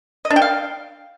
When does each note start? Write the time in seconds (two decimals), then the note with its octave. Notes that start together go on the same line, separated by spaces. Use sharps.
0.25 D#5
0.30 D4
0.36 G5
0.42 F5